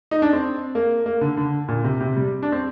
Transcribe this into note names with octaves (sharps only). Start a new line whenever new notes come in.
D#4
D4
C4
A#3
A#3
D3
D3
A#2
C3
C3
G3
D4
C4